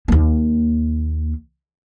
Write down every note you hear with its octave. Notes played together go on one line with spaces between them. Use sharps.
D#2 A#3